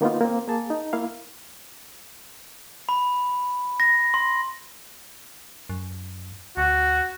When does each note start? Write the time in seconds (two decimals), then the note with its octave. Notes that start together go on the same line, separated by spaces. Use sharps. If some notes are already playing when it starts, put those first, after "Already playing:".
0.01 D#3 A#3 B3 D#4 F4
0.21 A#3 C4
0.48 A#3 G#4 A5
0.70 D#4
0.93 A#3 E4 F5
2.89 B5
3.80 A#6
4.14 C6
5.70 F#2
6.57 D2 F#4